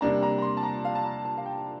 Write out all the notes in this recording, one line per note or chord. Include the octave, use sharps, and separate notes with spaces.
C3 G3 A#3 D4 A#5
A#5
A#5
C6
A5
A#5
F5
A5
A#5
A5
F5
G5